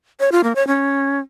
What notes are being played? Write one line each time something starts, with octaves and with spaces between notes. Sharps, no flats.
C#5
F4
A#3
C#5
C#4